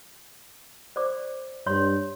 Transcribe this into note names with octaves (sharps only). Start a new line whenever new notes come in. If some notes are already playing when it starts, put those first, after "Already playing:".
C5 D5 D6
G2 C#5 C6